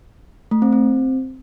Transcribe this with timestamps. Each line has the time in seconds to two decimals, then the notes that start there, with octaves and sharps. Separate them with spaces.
0.51 A3
0.62 C4
0.72 C4